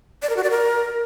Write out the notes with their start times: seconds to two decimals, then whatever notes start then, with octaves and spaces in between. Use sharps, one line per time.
0.23 D5
0.30 A#4
0.37 F#4
0.44 D5
0.51 A#4